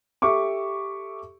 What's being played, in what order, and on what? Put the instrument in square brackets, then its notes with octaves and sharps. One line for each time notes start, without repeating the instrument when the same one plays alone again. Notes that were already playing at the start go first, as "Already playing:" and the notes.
[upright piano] G4 A4 E5 C#6 D6